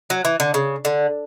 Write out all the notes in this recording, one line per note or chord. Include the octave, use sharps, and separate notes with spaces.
F#3
E3
D3
C#3
D3